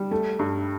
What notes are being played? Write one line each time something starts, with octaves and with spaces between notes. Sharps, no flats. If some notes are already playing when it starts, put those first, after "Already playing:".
Already playing: G3
A3
G2